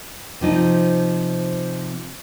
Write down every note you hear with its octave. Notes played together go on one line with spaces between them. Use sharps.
C3 F3 D#4